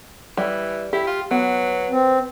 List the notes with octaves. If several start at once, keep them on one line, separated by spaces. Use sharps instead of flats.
E3 G3
E4 G4
F4
F#3 B3
C4